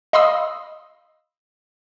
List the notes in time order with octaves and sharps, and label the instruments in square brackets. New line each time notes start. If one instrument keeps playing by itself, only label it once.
[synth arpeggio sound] D#5 F5 B5 C6 D#6 E6